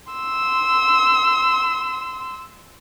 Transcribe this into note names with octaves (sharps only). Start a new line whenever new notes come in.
C6 E6